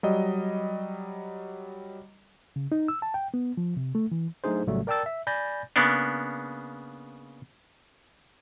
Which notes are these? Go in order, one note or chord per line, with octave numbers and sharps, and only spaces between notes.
F#3 G3 D#5
C#3
D#4
E6
A5
G5
B3
F3
C3
A3
E3
F#3 A3 D4 D#4 G#4 C5
A#1 A2 C#3 F#3 G3 A3
A#4 D5 G5 A5 E6 A6
E5
D5 G#5 B5 G6 A6 A#6
C#3 A#3 B3 D4